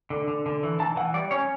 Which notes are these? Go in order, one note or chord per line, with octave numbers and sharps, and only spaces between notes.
D3
D3
D3
E3
E3 A5
E3 F#5
G3 D5
C#4 C#5